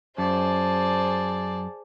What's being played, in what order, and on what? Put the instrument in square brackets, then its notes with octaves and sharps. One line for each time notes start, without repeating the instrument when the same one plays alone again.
[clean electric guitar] F#2 [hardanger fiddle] G#4 C5 [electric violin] D5 A5